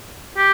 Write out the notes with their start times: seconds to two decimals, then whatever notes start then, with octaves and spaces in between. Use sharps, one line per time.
0.37 G4